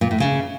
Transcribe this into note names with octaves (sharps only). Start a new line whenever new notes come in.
A#2
A2
C#3